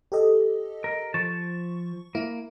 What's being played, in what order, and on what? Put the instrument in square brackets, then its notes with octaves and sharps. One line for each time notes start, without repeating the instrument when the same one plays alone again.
[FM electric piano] G4 A4 D#5
[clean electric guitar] A#4
[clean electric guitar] F3 A5 [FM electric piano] C#6
[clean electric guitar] A#3 [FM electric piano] E4